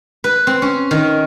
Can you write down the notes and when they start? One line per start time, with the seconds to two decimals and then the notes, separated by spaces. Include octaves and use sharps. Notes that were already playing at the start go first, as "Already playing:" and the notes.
0.24 B4
0.47 C4
0.62 C#4
0.91 D#3